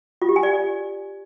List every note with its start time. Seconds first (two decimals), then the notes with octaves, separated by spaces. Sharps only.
0.22 F4
0.29 G4
0.36 G#5
0.43 D5